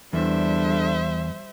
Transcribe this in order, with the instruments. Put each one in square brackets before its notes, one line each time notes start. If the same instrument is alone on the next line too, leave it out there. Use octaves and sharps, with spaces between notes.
[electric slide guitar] E2 [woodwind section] D3 D4 [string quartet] G3 [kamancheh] C5 E5